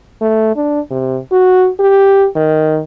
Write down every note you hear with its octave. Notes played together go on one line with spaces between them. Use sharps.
A3
D4
C3
F#4
G4
D#3